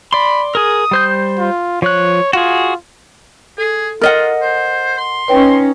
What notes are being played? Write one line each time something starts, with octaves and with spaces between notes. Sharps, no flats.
D5 B5 C6
G#4 A#4 D#6
G3 C5 G6
F4
F3 C#5 F#6
F4 F#4 G#4
G#4 A4
F4 A#4 D#5 F#5 F6
C5
C6
C#4 D#4 B4 C#5 G5